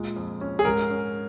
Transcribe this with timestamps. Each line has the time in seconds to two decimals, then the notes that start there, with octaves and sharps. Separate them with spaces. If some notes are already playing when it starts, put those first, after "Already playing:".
Already playing: A#2 G#3
0.16 F2
0.41 C#4
0.59 G#4
0.65 G#2 A#4
0.90 C#4